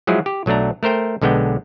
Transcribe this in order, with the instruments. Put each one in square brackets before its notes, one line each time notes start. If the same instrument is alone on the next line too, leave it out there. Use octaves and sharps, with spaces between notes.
[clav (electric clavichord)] F3 F#3 G#3 E4 G#4
G4
B1 F#3 A3 D4 A#5
A3 A#4 C5 G5
B1 D3 G#3 B3 G5